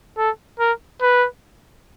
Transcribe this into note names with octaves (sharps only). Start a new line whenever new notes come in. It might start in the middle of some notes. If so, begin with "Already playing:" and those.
A4
A#4
B4